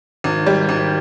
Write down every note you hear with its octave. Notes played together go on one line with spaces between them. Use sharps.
G#1
G3
G#1